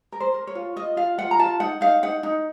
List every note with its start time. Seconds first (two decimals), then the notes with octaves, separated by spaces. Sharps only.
0.12 A#4
0.20 C5
0.34 A#4
0.47 C#5
0.55 F4
0.76 F4 D#5
0.97 F4 F5
1.18 F4 F#5
1.31 A#5
1.39 F4 A5
1.60 D#4 F#5
1.81 D#4 F5
2.03 D#4 F#5
2.23 D#4